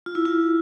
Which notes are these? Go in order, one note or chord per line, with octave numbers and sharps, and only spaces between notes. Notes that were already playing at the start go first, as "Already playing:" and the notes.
F4
E4
F4